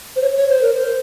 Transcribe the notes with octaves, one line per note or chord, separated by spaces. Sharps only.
C5
C#5
C#5
C5
A#4
C5